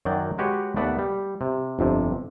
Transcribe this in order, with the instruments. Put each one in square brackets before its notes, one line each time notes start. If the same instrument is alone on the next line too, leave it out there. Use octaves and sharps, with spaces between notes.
[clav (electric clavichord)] F#2 D#3 F#3 D5 G5
G#3 F#4 G4 B4 C#5
D#2 A3 B3 D5 E5 F#5
G3
C3
G1 F2 C3